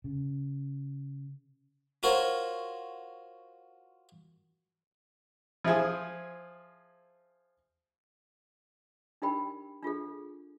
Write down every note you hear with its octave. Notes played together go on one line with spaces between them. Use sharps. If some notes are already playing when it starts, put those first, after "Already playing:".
C#3
F4 F#4 A#4 C5 C#5
F3 E4 G#4 C5
D4 D#4 G4 A#4 G5 B5
D4 F4 G#4 A4